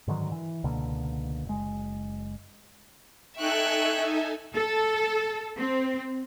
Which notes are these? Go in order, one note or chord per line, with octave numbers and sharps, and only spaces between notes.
G#2 D3 D#3 F#3
E3
C#2 B2 D3 A#3
F#1 G#3
D#4 A4 E5 G5 G#5 C#6 F#6
A4
C4